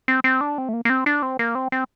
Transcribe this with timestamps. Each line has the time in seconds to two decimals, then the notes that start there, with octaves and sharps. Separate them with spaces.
0.08 C4
0.24 C4
0.41 D4
0.58 C4
0.69 A3
0.73 A#3
0.85 A#3
0.90 C4
1.06 D4
1.22 C4
1.39 A#3
1.55 C4
1.72 C4